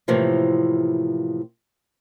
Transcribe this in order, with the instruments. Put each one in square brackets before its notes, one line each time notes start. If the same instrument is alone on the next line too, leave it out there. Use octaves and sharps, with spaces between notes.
[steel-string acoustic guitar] A2 C3 E3 F3 A#3